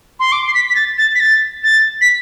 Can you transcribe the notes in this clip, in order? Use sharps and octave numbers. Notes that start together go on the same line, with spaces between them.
C6
D6
C7
B6
B6
A6
A6
B6
A6
A6
B6